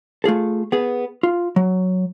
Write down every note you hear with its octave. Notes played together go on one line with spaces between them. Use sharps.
A3 F4 G#4 A4
B3 G#4
F4
F#3